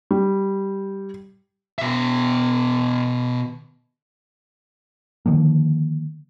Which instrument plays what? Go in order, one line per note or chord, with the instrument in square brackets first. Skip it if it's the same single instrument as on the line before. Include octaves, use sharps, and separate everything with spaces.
[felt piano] G3
[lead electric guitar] B2 E5
[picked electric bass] D3 D#3 F3 A#3